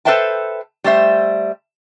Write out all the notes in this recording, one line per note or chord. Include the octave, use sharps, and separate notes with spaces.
A4 B4 C5 E5 G5 A5
G3 A3 C5 E5